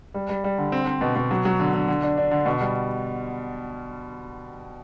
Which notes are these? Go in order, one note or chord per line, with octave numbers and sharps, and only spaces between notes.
G3
G3
G3
D3
C4
C4
B2
B2
F#3
F#3
D3
D3
D3
D4
D4
D3
B2
G3